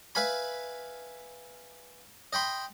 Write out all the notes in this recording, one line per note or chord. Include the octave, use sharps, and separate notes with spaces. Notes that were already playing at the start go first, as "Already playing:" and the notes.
B4 E5 F5 G#5 B5
D#5 G5 B5 C6